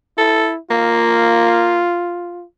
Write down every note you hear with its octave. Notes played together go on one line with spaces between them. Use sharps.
E4 A4
A#3 F4